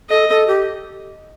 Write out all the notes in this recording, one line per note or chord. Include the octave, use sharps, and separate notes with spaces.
A4 D#5
A4
G4